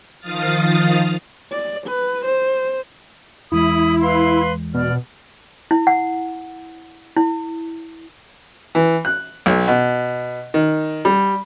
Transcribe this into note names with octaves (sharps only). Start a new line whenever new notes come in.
D#3 F3 F5 D#6 F6 A6
D5
B4
C5
E2 E3 G#3 E4 B5 D#6
B4 F5 C6
B2 D5 F6
E4
F#5
E4
E3
F#6
B1
B2
D#3
G3